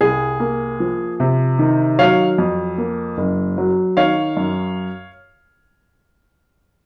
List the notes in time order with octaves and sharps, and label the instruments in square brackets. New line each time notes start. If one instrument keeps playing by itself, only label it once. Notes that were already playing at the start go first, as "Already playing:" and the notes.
[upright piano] C2 G#4
A#3
F3
C3
D#3
F#3 C#5 F5
F2
A#3
F#1
F#3
D#3 C#5 F5
F#2